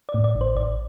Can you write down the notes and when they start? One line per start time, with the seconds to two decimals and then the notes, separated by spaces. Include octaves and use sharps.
0.09 D5
0.14 A2
0.24 D5
0.35 A1
0.41 C5
0.56 A1 D5